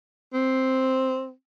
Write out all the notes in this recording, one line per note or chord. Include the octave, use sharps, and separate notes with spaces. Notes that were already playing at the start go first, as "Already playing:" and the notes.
C4